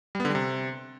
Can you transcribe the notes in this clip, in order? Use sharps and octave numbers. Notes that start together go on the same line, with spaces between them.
G3
B3
D3
G3
C3